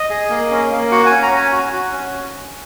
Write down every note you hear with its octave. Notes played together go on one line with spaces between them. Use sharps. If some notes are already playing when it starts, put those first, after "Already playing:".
Already playing: D#5
G#4
A#3
C#4
A#3
F#4 F#5
C#4 G#5
A#5
C#4 G#5
F#4
F#4
C#4